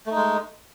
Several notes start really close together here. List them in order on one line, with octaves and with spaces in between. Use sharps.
A3 D#4 G#3